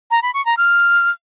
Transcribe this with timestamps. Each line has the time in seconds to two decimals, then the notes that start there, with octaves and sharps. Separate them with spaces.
0.11 A#5
0.22 B5
0.34 C#6
0.46 A#5
0.57 F6